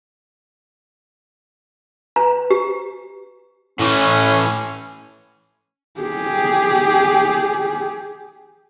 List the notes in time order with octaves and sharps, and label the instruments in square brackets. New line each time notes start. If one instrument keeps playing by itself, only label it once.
[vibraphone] B4 [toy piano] A#5
[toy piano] G4
[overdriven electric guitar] A2 E3 [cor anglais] C#4
[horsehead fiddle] G4 G#4